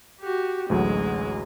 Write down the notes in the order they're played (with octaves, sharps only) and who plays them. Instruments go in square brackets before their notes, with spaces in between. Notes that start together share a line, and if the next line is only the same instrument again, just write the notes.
[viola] F#4 G4
[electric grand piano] A1 D2 F#3 [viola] G#3